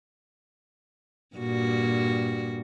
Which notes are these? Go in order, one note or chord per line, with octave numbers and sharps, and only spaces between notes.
G2 A#2 F#4